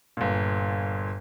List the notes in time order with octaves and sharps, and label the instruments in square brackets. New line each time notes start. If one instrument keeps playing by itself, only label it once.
[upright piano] G1 A#2